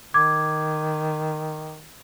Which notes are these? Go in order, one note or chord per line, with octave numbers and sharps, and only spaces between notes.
D#3 D6 G#6